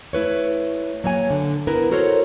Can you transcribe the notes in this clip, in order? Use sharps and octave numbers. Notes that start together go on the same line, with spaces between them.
A3 E4 B4 C#5
F#3 A#3 C#5 G#5
D3
B3 E4 A#4 B4
F#4 A4 A#4 C5 C#5